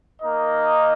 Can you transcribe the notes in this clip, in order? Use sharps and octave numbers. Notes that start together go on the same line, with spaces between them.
A#3 D#4 A#4 D#5